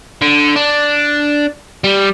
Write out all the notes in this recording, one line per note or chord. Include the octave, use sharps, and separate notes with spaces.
D3
D4
G3